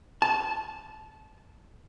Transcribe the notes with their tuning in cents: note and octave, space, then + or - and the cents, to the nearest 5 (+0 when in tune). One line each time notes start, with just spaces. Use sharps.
A5 -20